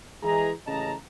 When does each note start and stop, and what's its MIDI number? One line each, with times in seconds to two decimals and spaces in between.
0.22 0.50 52
0.22 0.50 56
0.22 0.50 68
0.22 0.50 82
0.67 0.93 33
0.67 0.93 49
0.67 0.93 75
0.67 0.93 81
0.67 0.93 82